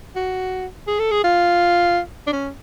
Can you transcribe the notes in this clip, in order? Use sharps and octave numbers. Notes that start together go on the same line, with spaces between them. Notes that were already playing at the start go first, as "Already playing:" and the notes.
F#4
G#4
A4
G#4
F4
D4
C#4